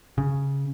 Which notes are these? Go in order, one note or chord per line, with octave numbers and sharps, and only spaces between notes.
C#3